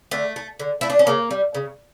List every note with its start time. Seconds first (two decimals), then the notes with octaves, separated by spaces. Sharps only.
0.11 D3 A3
0.36 A3
0.60 D3
0.81 A3 E4
0.90 D4
0.99 C#4
1.07 C#3 A#3
1.31 G3
1.55 C#3